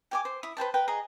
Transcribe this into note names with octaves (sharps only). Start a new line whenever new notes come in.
G4 G#5 D6
C5
E4 D#6
B4 C5 G5 A5
A#4 B4 G5
G#4 D#5 A#5